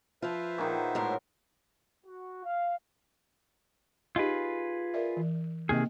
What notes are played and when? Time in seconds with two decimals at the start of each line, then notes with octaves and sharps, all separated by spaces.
0.22 F3 F4 B4 C5 E5
0.58 A#2 D#3 A#3 B3 G#4
0.74 D#4 D5 D#5
0.95 A2 F#3 G#3 A#4 C#5 C6
2.05 F#4
2.44 F5
4.16 D#4 F4 G4 G#4 B4 D#5
4.94 A#4 D5 E5
5.17 E3
5.69 C3 D#3 A#3 G#4 D#5